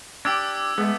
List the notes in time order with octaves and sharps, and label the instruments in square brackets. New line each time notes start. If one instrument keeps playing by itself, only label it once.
[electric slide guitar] D4 G4 [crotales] D6 E6 G#6
[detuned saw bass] G#3 [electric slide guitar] A3 B3